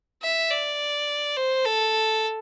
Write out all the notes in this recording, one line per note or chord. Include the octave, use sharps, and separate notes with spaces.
E5
D5
C5
A4